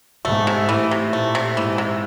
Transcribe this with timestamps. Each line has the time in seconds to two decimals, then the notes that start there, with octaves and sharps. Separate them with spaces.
0.25 G#2 A3
0.47 C3
0.69 A2 E3
0.91 C3
1.13 A#2 A3
1.35 C3
1.56 G#2 E3
1.78 C3